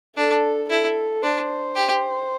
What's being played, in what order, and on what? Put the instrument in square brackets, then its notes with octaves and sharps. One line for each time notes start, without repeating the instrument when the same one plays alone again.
[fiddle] D4 [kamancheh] A4
[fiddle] E4 [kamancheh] A4
[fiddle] D4 [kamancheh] C5
[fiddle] G4